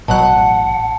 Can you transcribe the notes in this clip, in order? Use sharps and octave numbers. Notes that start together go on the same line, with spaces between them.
A1 B2 F#3 F#5 A5 F#6